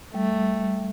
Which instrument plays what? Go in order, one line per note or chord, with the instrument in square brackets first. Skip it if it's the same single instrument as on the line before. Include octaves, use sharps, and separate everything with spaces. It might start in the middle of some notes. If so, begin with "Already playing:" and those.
[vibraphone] G3 [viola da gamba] A3